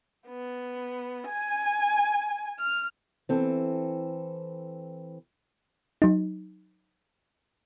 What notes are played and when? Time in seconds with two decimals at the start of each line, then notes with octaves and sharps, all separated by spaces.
0.28 B3
1.26 G#5
2.59 F6
3.29 E3 C4 A4
6.02 F#3 D#4